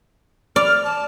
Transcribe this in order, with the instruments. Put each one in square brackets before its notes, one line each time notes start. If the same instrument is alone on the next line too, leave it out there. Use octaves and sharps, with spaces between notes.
[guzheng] D5 [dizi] F6
[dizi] A5